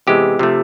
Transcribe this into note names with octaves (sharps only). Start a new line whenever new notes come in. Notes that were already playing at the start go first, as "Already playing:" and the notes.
E2 C3 E3 G#3 G4
C3 F3 A3